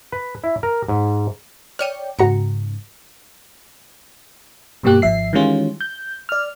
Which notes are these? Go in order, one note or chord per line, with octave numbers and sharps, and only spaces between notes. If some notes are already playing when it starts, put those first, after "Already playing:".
B4
E4
A#4
G#2
C#5 D5 G5 F6 C#7 D#7
G#2 C#3 F#4 A#5 C#7
G2 B2 G3 A#3 G4 F#6
G#1 F3 E5 C7
D#3 E3 G3 G#3 C#4 F4
G6
D5 F6